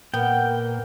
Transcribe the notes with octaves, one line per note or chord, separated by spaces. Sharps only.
A#2 B3 A#4 G5